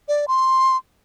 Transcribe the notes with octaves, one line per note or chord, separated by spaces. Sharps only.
D5
C6